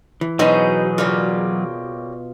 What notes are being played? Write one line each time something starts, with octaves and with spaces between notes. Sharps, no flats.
E3
B2 F#3 C#4 D#4 G#4 C5
C#3 G3 A#3 F4